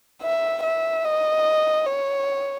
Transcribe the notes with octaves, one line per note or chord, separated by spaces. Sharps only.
E5
E5
D#5
C#5